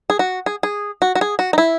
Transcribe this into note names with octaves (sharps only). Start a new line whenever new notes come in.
G#4
F#4
G#4
G#4
F#4
F#4
G#4
F#4
D#4
E4